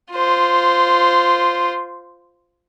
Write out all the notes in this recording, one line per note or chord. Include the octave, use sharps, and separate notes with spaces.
F4 C5